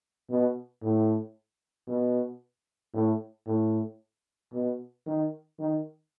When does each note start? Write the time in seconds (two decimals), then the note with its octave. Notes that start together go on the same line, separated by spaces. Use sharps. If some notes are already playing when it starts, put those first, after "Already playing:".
0.29 B2
0.82 A2
1.88 B2
2.94 A2
3.47 A2
4.53 B2
5.06 D#3
5.59 D#3